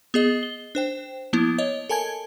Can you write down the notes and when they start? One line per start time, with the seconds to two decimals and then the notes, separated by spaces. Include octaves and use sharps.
0.14 B3 G#4 D#5
0.43 G7
0.75 D4 C5 G5
1.33 F3 A#3 B3 E4
1.58 C#5 D#5
1.89 A4 A#4 G#5 A5 G#6